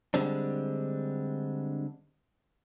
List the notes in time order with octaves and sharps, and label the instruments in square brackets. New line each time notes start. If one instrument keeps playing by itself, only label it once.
[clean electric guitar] D3 G3 G#3 C4 D4